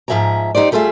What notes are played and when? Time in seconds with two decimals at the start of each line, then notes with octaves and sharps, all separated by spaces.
0.08 G#2 F3 F#3 E5 G#5 A#5
0.55 D#4 G4 C5 D5
0.71 D2 G3 A3 F4 G#4 E5